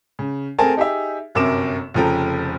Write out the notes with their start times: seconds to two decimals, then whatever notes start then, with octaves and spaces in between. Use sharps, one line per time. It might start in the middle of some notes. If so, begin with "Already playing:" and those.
0.19 C#3
0.59 A3 C4 G#4 A#4 G#5 A5
0.77 D#4 G4 G#4 E5
1.35 G1 F#2 C3 A#4 D6 E7
1.94 F1 C#3 F3 A4 G5 A#5